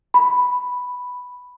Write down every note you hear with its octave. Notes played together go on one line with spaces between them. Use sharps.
B5